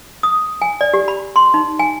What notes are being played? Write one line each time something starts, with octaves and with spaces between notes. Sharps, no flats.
D#6
G#5
D5
G4
B5
C6
D#4
G#5